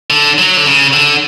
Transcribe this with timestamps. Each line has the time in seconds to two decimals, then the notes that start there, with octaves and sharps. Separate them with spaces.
0.10 D3
0.38 F#3
0.57 D3
0.66 C#3
0.93 D3